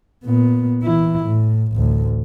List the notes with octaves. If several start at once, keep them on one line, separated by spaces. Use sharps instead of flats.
A#2 B3
E3 E4
A2
A1 D2